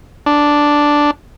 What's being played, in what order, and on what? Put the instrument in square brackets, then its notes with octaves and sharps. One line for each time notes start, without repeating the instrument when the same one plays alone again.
[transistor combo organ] D4